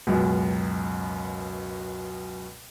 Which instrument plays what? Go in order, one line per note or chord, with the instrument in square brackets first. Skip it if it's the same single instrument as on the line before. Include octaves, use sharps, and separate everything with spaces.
[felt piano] C#2 F#2 B2